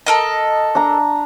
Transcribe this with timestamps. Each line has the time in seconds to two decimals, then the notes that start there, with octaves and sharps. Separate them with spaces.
0.06 A4 A#4 D#5
0.75 D4 A#5